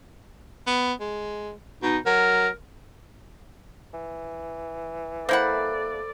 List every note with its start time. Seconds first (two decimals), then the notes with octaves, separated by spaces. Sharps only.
0.67 B3
1.01 G#3
1.83 B2 D#4
2.06 F#3 A#4
3.94 E3
5.29 A#3 E4 A4 C5 D5 F#5 B5